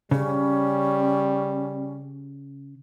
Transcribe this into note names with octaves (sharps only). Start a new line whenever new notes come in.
C#3 G3 C#4